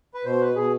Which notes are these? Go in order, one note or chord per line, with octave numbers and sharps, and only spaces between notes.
B4
B2 C5
B4
B2 G#4